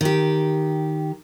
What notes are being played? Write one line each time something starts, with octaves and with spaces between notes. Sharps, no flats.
D#3 G4